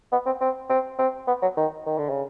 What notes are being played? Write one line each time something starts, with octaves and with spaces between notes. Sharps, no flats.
B3
C4
C4
C4
C4
B3
F#3
D#3
D#3
D3
C#3